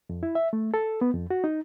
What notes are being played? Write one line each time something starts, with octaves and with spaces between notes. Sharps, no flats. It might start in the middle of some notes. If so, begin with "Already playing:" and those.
F2
E4
E5
A3
A4
B3
F2
F#4
D#4